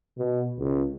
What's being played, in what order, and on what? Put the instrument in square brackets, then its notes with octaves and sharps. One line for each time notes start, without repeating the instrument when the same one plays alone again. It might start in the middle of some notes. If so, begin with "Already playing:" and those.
[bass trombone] B2
C#2